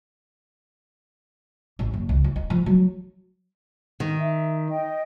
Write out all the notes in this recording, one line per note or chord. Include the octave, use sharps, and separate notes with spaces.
A1
F#1
C#2
E4
D#4
F3
F#3
D#3
E5
D#5 G5